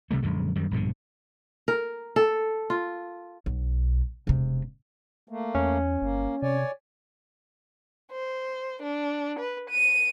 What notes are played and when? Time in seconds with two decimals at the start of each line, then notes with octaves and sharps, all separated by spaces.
0.11 C2 C3 G3 A3
0.22 A#1 F#2 D3 G#3
0.56 F#2 D#3 G3
0.71 A#1 G2 B2 D3
1.68 A#4
2.16 A4
2.70 F4
3.46 B1
4.27 E1 C3
5.29 A3 A#3
5.55 E2 C#4
6.01 G1 A#3
6.42 C3 C#5 D5 G#5
8.11 C5
8.82 D4
9.39 B4
9.70 D#7